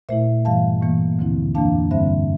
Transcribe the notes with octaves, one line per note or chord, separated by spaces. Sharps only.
A#2 A3 E4 C5 E5
G2 E3 G3 F5 A5
A2 E3 A#3
D2 D3 F3 C4 E4
F2 E3 A#3 D4 F5 A5
G2 D3 G3 C4 C5 E5